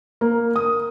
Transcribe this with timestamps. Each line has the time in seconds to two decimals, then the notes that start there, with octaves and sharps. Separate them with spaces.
0.21 A#3
0.56 D#6